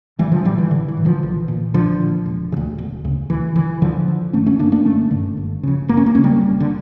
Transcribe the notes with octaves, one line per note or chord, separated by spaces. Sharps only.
A1 E3 G3
D3 F3
A2 E3 G3
E3
A1 D3
E3
A2
D3 F3
A#1 E3
A#2
A#1 D3 F3
A#2
E1
C#3
D2
E1
D2 C#3
D2 E3
D3 E3
D2 D3 F3
D3
G1 A3 C#4
A3 C#4
G2 D3 A#3 D4
A#3 D4
G1 A3 C#4
G2 D3
G1
F2 C#3
G1 A#3
C#4
A#3
F2 C#3 C#4
G3 A#3
F1
D3